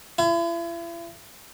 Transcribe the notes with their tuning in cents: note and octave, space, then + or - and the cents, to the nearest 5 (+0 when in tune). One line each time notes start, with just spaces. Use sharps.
E4 +40